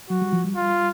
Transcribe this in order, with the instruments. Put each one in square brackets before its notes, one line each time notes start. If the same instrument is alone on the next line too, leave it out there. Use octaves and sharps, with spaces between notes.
[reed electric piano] F#3 [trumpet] F#4
[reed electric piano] G3
F3
G3
[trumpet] F4